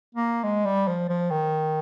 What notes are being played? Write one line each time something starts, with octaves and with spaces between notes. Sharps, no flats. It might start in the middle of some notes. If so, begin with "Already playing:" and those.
A#3
G#3
G3
F3
F3
D#3